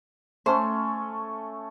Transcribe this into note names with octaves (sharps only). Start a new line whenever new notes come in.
A3 C#4 A4 C5